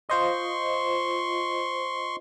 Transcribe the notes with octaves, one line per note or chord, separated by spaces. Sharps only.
F4 C5 D#5 C6 C#6